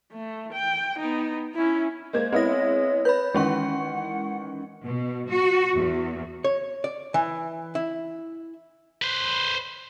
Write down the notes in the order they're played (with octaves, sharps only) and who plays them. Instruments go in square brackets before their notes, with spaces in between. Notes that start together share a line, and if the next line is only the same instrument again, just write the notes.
[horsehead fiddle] A3
G5
B3 D#4
C#4 E4
[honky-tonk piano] G#3 A#3 G#6 [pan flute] C5
[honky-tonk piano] G#3 B3 E4 [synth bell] C4 A#6 [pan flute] C#5
[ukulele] B4 [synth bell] B5 G6
[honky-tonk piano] D#3 E3 [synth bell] G#3 C#4 C#6 [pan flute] F#5
[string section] B2
F#4
E2
[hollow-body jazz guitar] C#5
D5
E3
E4
[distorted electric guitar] B4 C5